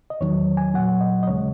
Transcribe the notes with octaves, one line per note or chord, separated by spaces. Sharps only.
D#5
E2 D#3 F#3 C#5
G#5
A#2 F#3 F#5
D#5
D#5
D#2 C#3 G#3 C#5